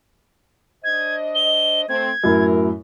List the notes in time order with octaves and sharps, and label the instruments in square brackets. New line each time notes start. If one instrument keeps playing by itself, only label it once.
[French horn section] D4 C5 D#5 [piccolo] G#6
[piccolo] G7
[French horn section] A3 C4 [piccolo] G#6
[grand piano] F#2 A2 E4 [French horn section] A#4